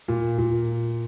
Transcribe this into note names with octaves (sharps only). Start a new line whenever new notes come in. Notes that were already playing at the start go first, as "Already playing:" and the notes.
A#2
A#2